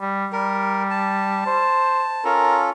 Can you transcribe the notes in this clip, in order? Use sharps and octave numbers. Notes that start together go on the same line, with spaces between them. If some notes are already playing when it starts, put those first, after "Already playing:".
G3
G3 A#4
A5
C5
C#4 F4 A4 A#4